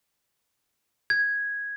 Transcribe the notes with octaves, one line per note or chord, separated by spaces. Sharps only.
G#6